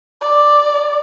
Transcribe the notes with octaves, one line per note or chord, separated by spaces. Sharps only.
D5